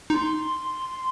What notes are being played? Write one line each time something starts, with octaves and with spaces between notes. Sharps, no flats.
D#4 C6